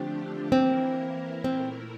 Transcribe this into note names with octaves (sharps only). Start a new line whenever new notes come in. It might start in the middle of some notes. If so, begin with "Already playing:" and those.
Already playing: D3 F3 A3 C4 D4 G4
E3 A#3 C4 E4 A#4
A#2 A3 C4 E4 A#4